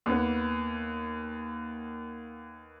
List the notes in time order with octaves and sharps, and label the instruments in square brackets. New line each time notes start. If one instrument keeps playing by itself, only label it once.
[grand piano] D#2 B3